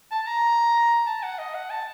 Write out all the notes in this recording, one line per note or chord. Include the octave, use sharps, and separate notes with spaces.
A5
A#5
A5
F#5
D#5
F#5
A5